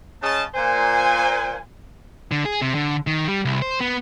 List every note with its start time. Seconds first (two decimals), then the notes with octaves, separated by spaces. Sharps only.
0.23 C#3 G#3 C#4 D#5 A5
0.55 A#2 C5 G#5
2.31 D3
2.45 G#4
2.61 C3
2.75 D3
3.07 D#3
3.28 G3
3.45 C2
3.62 C5
3.80 B3